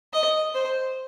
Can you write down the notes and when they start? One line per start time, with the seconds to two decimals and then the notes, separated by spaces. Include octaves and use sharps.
0.13 D#5
0.54 C5